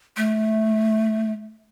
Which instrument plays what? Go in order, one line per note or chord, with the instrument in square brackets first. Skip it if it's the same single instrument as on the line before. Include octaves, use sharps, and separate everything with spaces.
[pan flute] A3